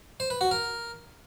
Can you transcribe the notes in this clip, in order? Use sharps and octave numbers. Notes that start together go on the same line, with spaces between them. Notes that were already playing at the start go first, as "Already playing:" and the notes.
C5
B4
F#4
A#4